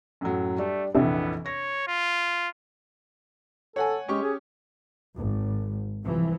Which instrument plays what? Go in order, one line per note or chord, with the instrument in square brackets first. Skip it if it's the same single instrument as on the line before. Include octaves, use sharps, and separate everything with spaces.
[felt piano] F#2 A2 F#3
[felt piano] G3 D4 G4 [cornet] A3
[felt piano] F1 A#1 E3 [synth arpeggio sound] C3 D4 E5 [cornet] B3
[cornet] C#5 [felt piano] A#6
[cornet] F4
[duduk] A4 [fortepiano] C#5 F#5 G#5
[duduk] G#3 [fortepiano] C#4 G4 C#6
[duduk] G#4
[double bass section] G#1
C2 E3 F3